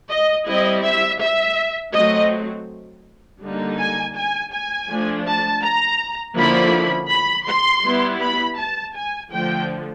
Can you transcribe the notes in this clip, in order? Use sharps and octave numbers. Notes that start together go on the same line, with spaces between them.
D#5
G3 C4 E4 D#5
E5
E5
F#3 A3 C4 D#5
D3 G3 A#3 D#4
G#5
G#5
G#5
F3 A3 D4
A5
A#5
D3 F3 A#3 C#4 E4 B5
B5
C6
G3 B3 E4
B5
A5
G#5
D3 F3 A3 G5